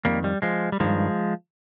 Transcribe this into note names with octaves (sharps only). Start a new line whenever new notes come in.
F2 D#3 G3 A#3
G3
F3 G#3
G3
G2 D#3 F3 G#3